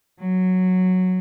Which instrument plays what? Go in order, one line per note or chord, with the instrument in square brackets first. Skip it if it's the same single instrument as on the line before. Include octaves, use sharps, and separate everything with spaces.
[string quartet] F#3